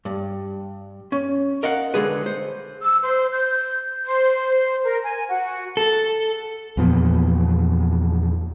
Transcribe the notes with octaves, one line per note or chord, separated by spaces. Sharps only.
G2
C#4
A#4 D#5 F5 F#5
D3 G#3 G#4 B4
C5
E6
C5
G6
C5
A#4
G#5
F#4
A4
E2 A#2 F3 B3